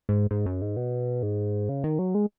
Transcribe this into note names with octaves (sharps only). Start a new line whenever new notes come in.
G#2
G#2
F#2
G#2
B2
G#2
C#3
D#3
F#3
G#3